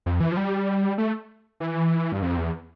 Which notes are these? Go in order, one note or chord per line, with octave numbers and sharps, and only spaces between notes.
F2
E3
F3
G3
A3
E3
G2
F2
E2